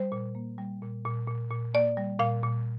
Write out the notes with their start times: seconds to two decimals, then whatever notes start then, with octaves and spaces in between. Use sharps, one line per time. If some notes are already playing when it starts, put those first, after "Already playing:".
Already playing: G3 C5
0.12 A#2
0.35 A#3
0.58 G3
0.82 A#2
1.05 A#2
1.28 A#2
1.51 A#2
1.74 A#3 D5
1.97 G3
2.20 A#2 F5
2.43 A#2